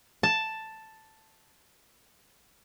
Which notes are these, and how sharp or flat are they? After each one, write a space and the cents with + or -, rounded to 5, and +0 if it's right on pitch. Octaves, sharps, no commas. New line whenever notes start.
A5 +5